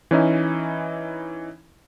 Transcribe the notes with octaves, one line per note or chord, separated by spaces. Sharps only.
E3 C#4 D#4 E4